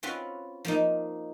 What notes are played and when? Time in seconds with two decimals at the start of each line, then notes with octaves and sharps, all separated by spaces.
0.03 C4 C#4 F4 F#4 B4
0.65 F3 A#3 D#4